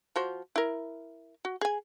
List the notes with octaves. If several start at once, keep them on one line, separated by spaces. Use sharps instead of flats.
F3 F#4 C5
E4 A#4
F#4
G#4 G#5